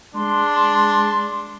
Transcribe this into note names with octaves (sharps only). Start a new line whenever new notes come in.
G#3 D4 C6